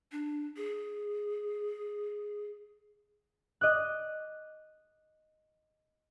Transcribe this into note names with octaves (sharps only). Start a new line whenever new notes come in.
D4
G#4
D#5 D6 F#6